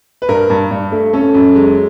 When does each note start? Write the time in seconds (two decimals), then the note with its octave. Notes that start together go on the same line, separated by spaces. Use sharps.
0.22 B4
0.29 G2 A#4
0.50 G2
0.71 G2
0.92 A3
1.13 C#4 A4
1.34 F#2
1.55 G#3